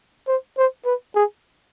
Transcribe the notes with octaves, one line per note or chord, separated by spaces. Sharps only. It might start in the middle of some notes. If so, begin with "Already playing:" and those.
C5
C5
B4
G#4